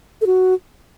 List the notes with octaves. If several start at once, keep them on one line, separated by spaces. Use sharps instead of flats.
A4
F#4